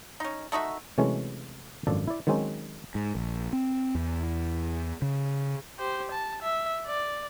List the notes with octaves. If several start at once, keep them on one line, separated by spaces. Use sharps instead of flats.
C#4 D#4
A3 D#4 F#4 E5
C3 E3 F#3 G#3 A3 C#4
G#1 F#2 F3 D4 A4 D5
E4 D5
D#3 F#3 G#3 C4 C#4 D#4
G#2
A#1
C4
E2
C#3
G4 C5
A5
E5
D5